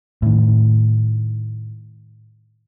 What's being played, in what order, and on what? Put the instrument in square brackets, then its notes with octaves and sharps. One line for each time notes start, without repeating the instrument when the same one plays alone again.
[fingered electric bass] A2 D#3